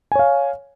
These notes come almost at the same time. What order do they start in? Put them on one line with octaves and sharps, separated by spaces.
G#5 C#5 F5